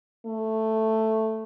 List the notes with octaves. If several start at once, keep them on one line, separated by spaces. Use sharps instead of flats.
A3